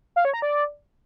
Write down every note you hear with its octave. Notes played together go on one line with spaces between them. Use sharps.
F5
C#5
A#5
D5